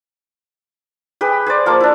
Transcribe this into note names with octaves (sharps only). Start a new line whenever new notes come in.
G4 G#4 B4
G#4 C5 D5
F3 A#3 A#4 D6
D4 E4